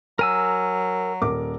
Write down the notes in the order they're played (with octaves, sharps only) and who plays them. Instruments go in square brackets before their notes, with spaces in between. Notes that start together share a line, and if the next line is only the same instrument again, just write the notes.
[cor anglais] F#3 [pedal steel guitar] A#4 G#5 E6
[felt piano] D#1 A#4 D6